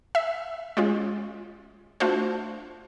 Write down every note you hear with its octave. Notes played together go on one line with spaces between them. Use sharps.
E5
G#3 C#4 F4
A3 D4 F4 F#4 C5